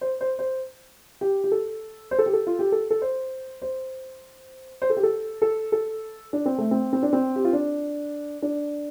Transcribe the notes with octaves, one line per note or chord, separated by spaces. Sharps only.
C5
C5
C5
G4
G4
A4
C5
A4
G4
A4
F4
G4
A4
A4
C5
C5
C5
A4
G4
A4
A4
A4
D4
C4
A3
C4
C4
D4
C4
G4
F4
D4
D4